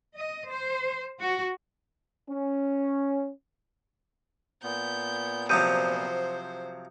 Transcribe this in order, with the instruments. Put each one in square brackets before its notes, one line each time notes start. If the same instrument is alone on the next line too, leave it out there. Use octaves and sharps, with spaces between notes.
[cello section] D#5
C5
F#4
[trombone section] C#4
[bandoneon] A#2 B3 [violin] G6
[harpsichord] C3 F3 F#3 [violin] C5 [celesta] D#6 G6 D#7